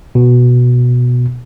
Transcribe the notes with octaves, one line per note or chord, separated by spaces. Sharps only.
B2